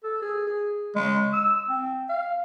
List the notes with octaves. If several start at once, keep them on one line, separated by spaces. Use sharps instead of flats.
A4
G#4
G#4
G#3
E6
C4
F5